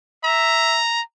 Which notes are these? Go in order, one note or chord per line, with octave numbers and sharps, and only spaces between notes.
E5 A#5